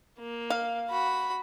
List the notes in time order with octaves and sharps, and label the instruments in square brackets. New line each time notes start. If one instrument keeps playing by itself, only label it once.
[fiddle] A#3
[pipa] F5
[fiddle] F#4 B5